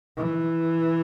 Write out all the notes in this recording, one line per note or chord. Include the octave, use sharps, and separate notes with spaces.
E3